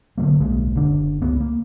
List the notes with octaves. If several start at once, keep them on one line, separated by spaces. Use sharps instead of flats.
D3 F3 F#3 A#3
D1 B1 G#3 A#3
F#1 D3 D4
C#2 B3
A#3